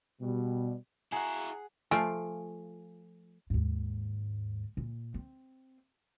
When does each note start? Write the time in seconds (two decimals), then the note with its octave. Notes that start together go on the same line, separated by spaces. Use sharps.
0.21 B2 G3
1.12 E4 F#4 G#4 F#5 G#5 A#5
1.91 F3 A3 F4 G#5
3.50 D#2 G#2
4.77 A#2
5.14 C4